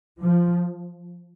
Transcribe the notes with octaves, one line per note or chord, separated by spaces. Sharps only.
F3